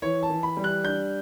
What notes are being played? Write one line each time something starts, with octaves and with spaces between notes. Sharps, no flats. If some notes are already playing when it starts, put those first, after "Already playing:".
E3 C#5
A5
E3
B5
G3
F#6
D4 G6